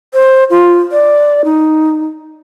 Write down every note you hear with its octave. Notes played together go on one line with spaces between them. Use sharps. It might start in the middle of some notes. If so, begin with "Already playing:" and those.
C5
F4
D5
D#4